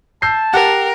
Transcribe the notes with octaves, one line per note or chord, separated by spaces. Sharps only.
A5 E6 G6 C7
G4 A#4 F#5